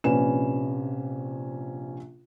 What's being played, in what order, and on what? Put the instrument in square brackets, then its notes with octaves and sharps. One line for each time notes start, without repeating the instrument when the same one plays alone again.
[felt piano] A#1 C3 C#4 B4 D5 E7